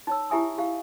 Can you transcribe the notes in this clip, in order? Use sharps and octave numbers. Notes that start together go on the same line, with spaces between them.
D#4 C#5 E6
E4 G4 E5 G#5 D#6
G4 F5